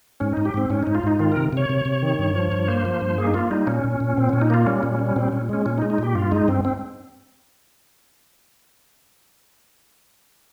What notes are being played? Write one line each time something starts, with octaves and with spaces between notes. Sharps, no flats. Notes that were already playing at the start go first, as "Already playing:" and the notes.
G#2 C#4
G#2 D#4
G4
G#2 C4
G#2 C#4
G#2 D#4
F4
G#2 D#4
D#3 F4
C3 A#4
C3 C#5
C3
C3
D#3
G2
F3
G2
A#3 C5
F3
G2
A#3 G#4
D#4
A#3 F4
G3 D#4
A#2 C#4
A#2
A#2
A#2 C4
A#2 C#4
D#4
A#3 F4
G3 C#4
A#2
G3
A#2 C4
A#2 C#4
G#3 C#4
A#2 C#4
D#4
G#3
D#4
A#2 G4
G2 F4
G#3 D#4
G2 C4
C4